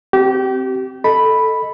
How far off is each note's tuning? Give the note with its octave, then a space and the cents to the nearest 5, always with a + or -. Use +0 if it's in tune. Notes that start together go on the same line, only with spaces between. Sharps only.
C4 +0 G4 -25
A4 +0 D#5 +0 B5 +0